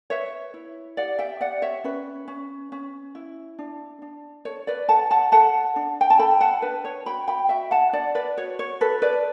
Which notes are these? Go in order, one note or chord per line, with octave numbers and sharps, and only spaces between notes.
B4 C#5 E5
E4
G4 D5 F#5
E5 G5
G4 D5 F#5
C#5 E5
C#4 B4
C#4
C#4
E4
D4
D4
A4 C#5
B4 D5
A4 F#5 A5
F#5 A5
A4 F#5 A5
D4
G5
A5
A4 G5 B5
F#5 A5
D4 B4
C#5
F#4 G5 B5
G5 B5
F#4 E5 G5
F#5 A5
D4 D5 F#5
B4 D5
F#4 C#5
C#5
A4 B4
B4 D5